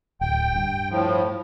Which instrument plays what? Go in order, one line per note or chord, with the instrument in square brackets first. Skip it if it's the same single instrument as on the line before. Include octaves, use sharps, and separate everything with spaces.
[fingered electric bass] D1 [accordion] G5
[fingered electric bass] G2
[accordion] A2 F3